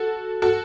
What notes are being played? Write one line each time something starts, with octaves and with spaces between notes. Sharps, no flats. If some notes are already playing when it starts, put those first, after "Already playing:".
Already playing: F#4 A4
F#4 A4